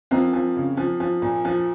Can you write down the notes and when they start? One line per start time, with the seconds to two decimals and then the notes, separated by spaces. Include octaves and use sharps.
0.11 F3 A#3 C4
0.33 F3
0.56 C#3
0.77 F3
1.00 F3
1.22 A#2
1.45 F3